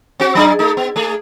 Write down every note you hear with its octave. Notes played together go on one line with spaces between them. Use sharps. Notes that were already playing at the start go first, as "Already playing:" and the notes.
C4 F#4
F#3 D4 G#4
A3 D#4
B3
A3 G#4